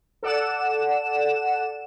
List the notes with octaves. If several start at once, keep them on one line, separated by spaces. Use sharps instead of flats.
A4 D5 F#5 E7